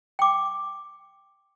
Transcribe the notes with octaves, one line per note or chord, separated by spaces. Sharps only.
G5 D6